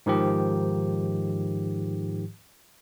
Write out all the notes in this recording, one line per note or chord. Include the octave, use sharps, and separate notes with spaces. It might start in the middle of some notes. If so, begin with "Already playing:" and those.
G#2 D#3 F3 G4